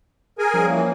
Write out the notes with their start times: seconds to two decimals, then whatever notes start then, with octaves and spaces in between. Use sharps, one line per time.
0.39 G#4 A#4 G#5
0.54 F3 G3 C#4
0.67 E3 A#3